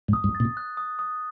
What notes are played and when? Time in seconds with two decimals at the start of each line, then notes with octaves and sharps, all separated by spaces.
0.08 G#2
0.13 D#6
0.24 G2
0.35 A6
0.40 A#2
0.57 F#6
0.77 D#6
0.99 D#6